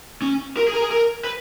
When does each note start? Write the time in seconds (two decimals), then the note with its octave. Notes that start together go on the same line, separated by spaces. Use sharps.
0.22 C#4
0.57 A#4
0.68 G#4
0.74 A#4
0.82 G#4
0.91 A#4
1.24 B4